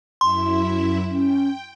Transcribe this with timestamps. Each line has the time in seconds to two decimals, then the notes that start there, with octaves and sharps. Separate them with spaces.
0.21 F#2 E4 E5 C6
1.10 C#4 G5